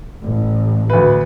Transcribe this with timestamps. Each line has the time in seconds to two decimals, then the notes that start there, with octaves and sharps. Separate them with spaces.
0.22 A1
0.90 D2 B4